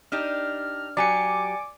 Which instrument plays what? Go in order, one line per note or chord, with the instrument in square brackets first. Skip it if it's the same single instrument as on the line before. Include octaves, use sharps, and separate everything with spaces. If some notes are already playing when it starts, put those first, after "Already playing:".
[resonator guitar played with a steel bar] D4 D#4 G4 [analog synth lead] F6
[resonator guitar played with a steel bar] F#3 G4 [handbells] D5 G#5 C#7 [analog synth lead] D6